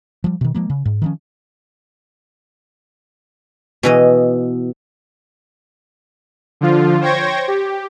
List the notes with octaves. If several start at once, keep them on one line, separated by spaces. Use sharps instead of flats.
F3 G3
B2 D#3
F3 G#3 A#3
C#3
G#2
D#3 F3 C#4
B2 E3 D#5
D3 F3 F4
C5 C#5 G5 C#6 G#6 A#6
G4